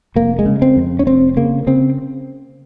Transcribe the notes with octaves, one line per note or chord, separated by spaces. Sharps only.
F1 A#3
G#3
C#3
C4
F2
C#4
F1 C4
C#3 A#3
C#3 C4